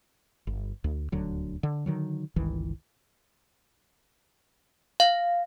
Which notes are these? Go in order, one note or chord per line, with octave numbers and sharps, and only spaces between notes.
G1
D2
D#1 D2 D3 F#3
D3
D3 D#3 F#3
G1 C#2 D#3 E3
F5